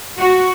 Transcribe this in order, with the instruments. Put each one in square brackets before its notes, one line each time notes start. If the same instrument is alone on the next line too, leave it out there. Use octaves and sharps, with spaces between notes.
[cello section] F#4